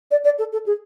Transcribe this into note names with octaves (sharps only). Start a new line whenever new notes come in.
D5
D5
A4
A4
G#4